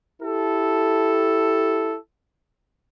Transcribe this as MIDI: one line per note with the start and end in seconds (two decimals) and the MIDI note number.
0.22 1.97 64
0.22 1.97 67
0.22 1.97 69